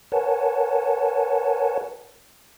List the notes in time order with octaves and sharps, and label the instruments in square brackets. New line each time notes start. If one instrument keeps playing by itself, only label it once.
[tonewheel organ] A#4 B4 C#5 F#5 G#5 A5